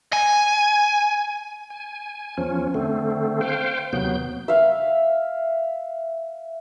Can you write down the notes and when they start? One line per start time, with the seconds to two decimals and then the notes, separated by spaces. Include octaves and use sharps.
0.13 G#5
1.70 G#5
2.38 E2 F3 C#4
2.74 D3 A3 C4
3.41 C5 F5 G5
3.93 D#2 C3 F#3 B3 G6
4.48 E5 F5